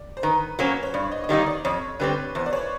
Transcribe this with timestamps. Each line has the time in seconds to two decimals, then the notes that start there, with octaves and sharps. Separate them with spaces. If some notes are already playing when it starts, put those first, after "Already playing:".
Already playing: D5
0.17 C5
0.23 D#3 B4
0.59 F#3 A#3 C#4 C5
0.83 C#5
0.94 G2 D5
1.11 D#5
1.24 D#5
1.29 D#3 G3 A#3 D#4 D5
1.46 D5
1.65 F2 C#5
2.00 D3 G3 C4 B4
2.35 E2 C5
2.46 D5
2.53 C#5